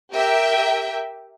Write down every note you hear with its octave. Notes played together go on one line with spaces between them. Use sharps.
G4 A#4 E5 G5